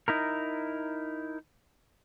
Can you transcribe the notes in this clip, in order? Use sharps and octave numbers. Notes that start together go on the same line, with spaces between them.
D#4 E4 A#4